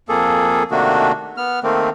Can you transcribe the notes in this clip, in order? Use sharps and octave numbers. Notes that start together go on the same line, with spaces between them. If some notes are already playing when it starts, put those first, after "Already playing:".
F2 A#3 G#4 A4
C3 D#3 A3 A#3 D4 F#4
B3 F6
D#3 A3 A#3 C4